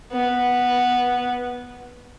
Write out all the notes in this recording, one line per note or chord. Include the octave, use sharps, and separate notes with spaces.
B3